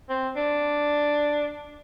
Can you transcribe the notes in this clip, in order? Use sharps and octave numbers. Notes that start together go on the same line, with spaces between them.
C4
D4